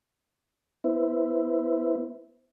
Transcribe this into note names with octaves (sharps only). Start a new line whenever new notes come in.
B3 E4 B4 C5 E5